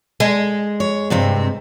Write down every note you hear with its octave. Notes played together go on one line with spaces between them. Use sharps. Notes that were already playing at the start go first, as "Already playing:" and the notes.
G#3
C#5
G2 C3 C4